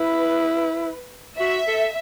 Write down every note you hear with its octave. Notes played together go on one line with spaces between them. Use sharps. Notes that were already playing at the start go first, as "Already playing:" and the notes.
Already playing: E4 B4
F#4 E5
A4